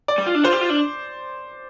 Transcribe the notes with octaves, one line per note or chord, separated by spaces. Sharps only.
D5
G3
F4
D4
F4 C5
G4
F4
D4